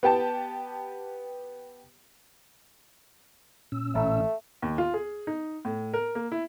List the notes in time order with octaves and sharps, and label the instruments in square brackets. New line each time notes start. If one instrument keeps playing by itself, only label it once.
[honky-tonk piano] B3 G4 G5 A5
[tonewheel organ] A#2 C#4 E6
[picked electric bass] A1 [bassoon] A3
[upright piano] D#2
F4
G#4
D#4
A2
A#4
A#3
E4